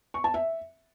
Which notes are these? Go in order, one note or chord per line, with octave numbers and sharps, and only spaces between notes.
C#6
A5
E5